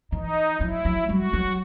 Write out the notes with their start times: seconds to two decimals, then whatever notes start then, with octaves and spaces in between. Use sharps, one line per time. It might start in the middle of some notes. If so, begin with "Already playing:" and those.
0.12 E3 D#4
0.61 F#3 E4
0.85 F#3
1.09 G3 F#4
1.33 F#3